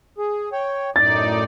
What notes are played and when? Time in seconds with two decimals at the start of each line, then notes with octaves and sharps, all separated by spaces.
0.18 G#4
0.52 C#5 G5
0.96 F#2 A2 D#4 D5 A6